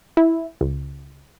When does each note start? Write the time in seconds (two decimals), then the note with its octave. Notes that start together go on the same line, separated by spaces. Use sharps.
0.17 E4
0.61 C#2